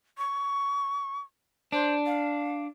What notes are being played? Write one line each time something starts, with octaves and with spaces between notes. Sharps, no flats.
C#6
D4 C5
F5